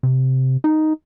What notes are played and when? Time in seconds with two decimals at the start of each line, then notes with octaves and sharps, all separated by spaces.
0.03 C3
0.64 D#4